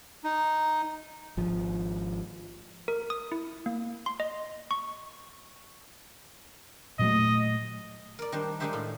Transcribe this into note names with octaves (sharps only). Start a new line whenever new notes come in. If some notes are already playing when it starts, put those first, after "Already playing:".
D#4
G#1 F3
A#4
D#6
E4
A#3
C6
D#5
C#6
A#2 F#3 A3 D#5
A#4 D5
D#3 G3 D4 C5
G#3 D4 D#4 G4 C5 E5
A2 F4